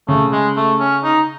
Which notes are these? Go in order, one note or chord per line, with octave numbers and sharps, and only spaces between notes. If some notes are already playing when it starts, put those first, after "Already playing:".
C#3 A3
G#3
A3
C#4
D#4